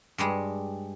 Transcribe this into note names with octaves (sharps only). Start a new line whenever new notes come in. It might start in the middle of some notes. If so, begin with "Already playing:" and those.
G2 G3 G#3